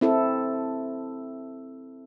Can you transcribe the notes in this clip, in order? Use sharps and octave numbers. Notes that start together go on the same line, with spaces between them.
C4 E4 A4